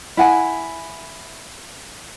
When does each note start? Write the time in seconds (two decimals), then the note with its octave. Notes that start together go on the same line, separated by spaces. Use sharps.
0.17 E4 F#5 G#5